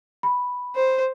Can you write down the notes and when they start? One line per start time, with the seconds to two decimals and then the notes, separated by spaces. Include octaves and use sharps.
0.23 B5
0.76 C5